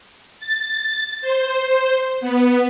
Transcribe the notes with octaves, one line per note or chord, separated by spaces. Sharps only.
A6
C5
B3